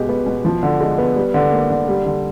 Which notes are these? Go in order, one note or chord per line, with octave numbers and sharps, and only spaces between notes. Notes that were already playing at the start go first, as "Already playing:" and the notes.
Already playing: B2 G#3 G4
B3
B2
F3
D3
G#3
B3
G3
D3
A#3
D3
G3
D3